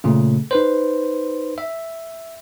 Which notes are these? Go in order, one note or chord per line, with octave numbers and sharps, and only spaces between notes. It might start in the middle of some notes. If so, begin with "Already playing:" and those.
A#2 C#3 A3
D#4 B4 C5
E5